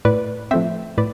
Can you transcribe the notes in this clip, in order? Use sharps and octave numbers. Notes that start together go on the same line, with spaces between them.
A2 B4 D5
F3 A3 C4 C5 E5
A2 B4 D5